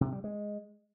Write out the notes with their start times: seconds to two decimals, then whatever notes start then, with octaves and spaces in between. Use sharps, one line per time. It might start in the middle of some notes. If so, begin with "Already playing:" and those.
0.01 C3
0.12 G3
0.24 G#3